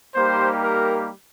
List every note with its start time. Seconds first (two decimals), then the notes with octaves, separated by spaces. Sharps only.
0.14 G3 A#3 D#4 G4 C5
0.62 A#4